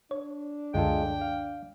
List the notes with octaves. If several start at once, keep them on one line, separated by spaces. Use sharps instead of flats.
D4 C#5
C#2 F#2 D3 G#3 F4 A4 G5
F5